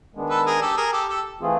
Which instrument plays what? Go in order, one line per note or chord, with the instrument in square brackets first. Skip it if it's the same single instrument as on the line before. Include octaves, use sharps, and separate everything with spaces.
[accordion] D#3 G#3 B3 D4
[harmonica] A4 B4
G#4 A#4
G4 A4
G#4 A#4
G4 A4
G4 A4
[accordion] E3 A3 C4 F4 G#4